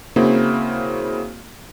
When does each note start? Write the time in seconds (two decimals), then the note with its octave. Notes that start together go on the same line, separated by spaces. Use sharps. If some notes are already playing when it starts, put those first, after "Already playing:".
0.16 C#3 A#3 C4 E4 F#4